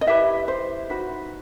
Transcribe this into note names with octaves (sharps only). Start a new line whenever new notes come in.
D#5
E4 G4 B4 E5
C5
D#4 F#4 B4